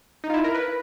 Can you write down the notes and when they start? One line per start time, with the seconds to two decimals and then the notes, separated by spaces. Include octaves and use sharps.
0.24 D#4
0.30 F4
0.34 E4
0.44 A#4
0.54 B4